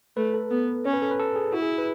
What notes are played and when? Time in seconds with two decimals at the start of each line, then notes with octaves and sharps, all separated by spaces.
0.17 A3 B4
0.34 A4
0.51 B3
0.85 C#4 C#5
0.93 B4
1.02 A4
1.11 B4
1.19 A4
1.36 G#4
1.53 E4 F#4
1.62 G#4
1.78 B4